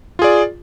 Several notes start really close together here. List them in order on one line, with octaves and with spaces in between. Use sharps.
F4 G#4 D5